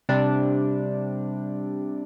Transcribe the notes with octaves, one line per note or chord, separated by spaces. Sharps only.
C3 G3 D4